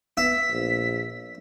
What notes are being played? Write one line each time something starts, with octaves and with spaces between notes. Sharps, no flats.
B3 E5 B6
A#1